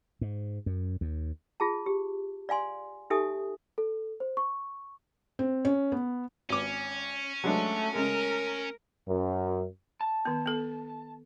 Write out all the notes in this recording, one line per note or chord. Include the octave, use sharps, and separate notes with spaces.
G#2
F#2
D#2
F4 G#4 A5
G4
D5 F5 G#5 C6
D#4 G4 A4 E5 G#5 D#6
A4
C5
C#6
C4
C#4
B3
G#1 C#4 D6
F#3 G#3 A3 D4
C#3 G#3 A#4
F#2
A5
D#3 B3
B3 A4